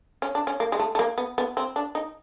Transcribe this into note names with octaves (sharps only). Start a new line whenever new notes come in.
C#4
D4
C#4
A#3
G#3
A3
A3
A#3
B3
B3
C4
D4
D#4